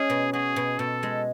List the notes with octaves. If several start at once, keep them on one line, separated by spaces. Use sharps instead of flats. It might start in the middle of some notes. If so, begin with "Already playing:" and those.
Already playing: G#3 C#4 G#4
B2
F#4 G#4
B2
B2 A4
G#3